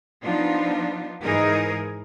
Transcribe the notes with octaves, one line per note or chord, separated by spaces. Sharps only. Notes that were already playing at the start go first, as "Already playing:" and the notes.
F3 B3 D4 D#4 F4
G#2 E3 D#4 G#4 A#4